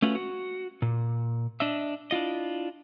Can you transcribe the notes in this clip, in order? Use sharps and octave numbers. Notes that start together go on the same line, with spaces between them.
A3 C#4 F4 F#4 B4
F#4
A#2
D4 D#5 E5
D4 E4 F4 D#5